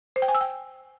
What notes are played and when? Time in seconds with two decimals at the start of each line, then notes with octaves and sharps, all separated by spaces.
0.16 C5
0.22 G5
0.28 G#5
0.35 E6
0.41 G5